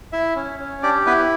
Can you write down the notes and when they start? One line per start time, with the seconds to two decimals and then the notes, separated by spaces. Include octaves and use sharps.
0.13 E4 E5
0.36 C#4
0.60 C#4
0.83 D4 G4 D5
1.06 B3 E4 B4